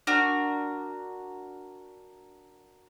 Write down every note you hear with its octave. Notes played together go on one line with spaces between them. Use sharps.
D4 F#4 A#4